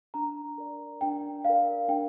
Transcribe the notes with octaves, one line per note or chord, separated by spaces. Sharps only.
D4 A#5
A#4 D5
D4 G5
A#4 D5 F5
D4 G5